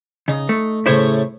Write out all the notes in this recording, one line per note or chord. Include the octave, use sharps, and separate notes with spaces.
C#3 D#4
A3
A2 C#3 A3 E4 C5 C#5